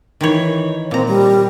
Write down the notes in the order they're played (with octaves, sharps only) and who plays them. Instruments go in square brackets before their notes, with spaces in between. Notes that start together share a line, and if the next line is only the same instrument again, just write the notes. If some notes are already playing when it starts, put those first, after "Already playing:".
[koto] D#3 E3 C#5
[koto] A#2 A#5 [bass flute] C4
[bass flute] G3